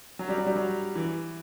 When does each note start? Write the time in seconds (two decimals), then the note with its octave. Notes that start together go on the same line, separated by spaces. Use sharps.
0.19 F#3
0.29 G3
0.38 F#3
0.46 G3
0.56 F#3
0.95 E3